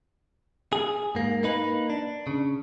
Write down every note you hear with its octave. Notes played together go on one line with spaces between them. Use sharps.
G#4
G#2 A#3
A#3 D#4 B4
D4
C#3